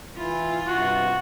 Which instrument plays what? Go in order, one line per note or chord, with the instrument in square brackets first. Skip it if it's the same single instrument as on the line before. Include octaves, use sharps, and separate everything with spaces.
[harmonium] E3 E4 [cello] F4
[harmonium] G2 C3 [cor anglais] F#4